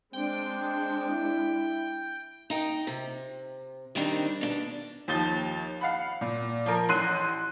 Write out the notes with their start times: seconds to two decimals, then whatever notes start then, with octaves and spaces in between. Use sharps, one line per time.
0.13 G#3 C4 D4 G5
1.08 E4
2.50 D#4 D#5 G5
2.87 C3
3.95 D#3 G3 C4 D4 D#4
4.41 B2 D4
5.08 D#2 F3 A6 G7
5.81 F5 F#5 B5
6.21 A#2
6.66 F3 A#4
6.89 A1 C6 F#6 C7 D#7